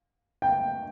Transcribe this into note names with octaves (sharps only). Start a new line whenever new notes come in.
G5